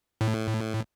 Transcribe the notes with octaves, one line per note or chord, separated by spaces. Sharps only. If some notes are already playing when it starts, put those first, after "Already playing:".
A2